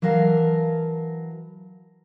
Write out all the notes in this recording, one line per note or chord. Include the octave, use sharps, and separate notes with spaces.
E3 F#3 A#4 F5 G5 A5